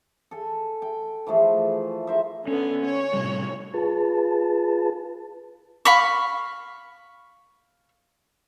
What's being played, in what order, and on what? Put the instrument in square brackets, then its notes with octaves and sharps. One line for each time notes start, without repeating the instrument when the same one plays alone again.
[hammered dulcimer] A4 G#5
G5
E3 F3 A3 G#4
A#4 C5 E5
[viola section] D3 B3 [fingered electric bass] C#4
[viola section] C#5
[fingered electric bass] A2 C3 G3
[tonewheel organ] F4 G#4 B4 A5
[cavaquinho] F5 B5 C#6